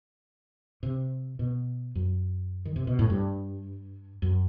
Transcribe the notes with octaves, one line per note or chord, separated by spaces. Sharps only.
C3
B2
F#2
D#3
C3
B2
A2
G2
F#2